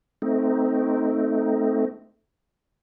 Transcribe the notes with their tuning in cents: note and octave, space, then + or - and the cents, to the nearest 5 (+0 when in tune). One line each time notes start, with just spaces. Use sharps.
A3 +0 C4 -15 D#4 +0